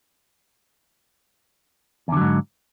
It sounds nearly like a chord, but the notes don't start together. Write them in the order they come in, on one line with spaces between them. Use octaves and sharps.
E2 D3 F#3 G#2